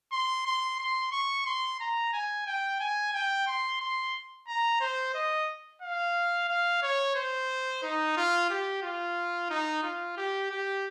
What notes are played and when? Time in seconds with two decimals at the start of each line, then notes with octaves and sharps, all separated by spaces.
0.12 C6
0.46 C6
0.79 C6
1.12 C#6
1.46 C6
1.80 A#5
2.13 G#5
2.46 G5
2.80 G#5
3.13 G5
3.47 C6
3.81 C6
4.48 A#5
4.80 C5
5.14 D#5
5.82 F5
6.49 F5
6.82 C#5
7.15 C5
7.83 D#4
8.16 F4
8.50 G4
8.82 F4
9.50 D#4
9.83 F4
10.17 G4
10.50 G4